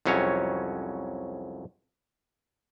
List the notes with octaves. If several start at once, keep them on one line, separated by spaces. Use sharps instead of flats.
C2 F2 F#3 C#4 C#5